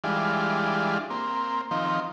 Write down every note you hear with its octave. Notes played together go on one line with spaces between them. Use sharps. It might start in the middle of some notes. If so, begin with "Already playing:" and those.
E3 G3 G#3 D4 F4
A#3 C4
D#3 F3 C4